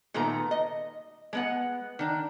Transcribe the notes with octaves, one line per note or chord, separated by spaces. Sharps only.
A#2 D#3 A3 B3 A#5
D#5
G#3 B3 F#5
D#3 D4